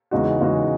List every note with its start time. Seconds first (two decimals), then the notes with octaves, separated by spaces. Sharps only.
0.11 E2 C#3 G#3 D#4 F#4
0.40 E2 C#3 G#3 D#4 F#4